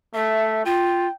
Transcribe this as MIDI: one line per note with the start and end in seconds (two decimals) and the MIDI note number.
0.14 0.64 57
0.14 0.62 76
0.65 1.08 65
0.65 1.13 79